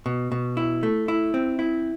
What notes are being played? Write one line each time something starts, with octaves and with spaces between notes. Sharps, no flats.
B2
B2
E4
A3
E4
C4
E4